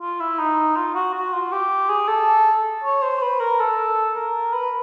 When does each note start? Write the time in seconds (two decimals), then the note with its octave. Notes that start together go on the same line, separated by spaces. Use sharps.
0.01 F4
0.20 E4
0.39 D#4
0.76 F4
0.95 F#4
1.14 F#4
1.33 F4
1.52 G4
1.89 G#4
2.08 A4
2.84 C#5
3.02 C5
3.22 B4
3.40 A#4
3.60 A4
4.16 A#4
4.53 B4